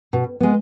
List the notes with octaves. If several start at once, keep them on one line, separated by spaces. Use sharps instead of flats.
B2
G#3 B3